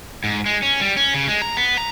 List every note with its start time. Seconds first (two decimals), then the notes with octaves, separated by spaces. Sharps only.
0.24 G#2
0.46 G#3
0.63 C#4
0.81 G3
0.97 C#4
1.14 C#3
1.28 G#3
1.42 A#5
1.57 B3
1.77 A#5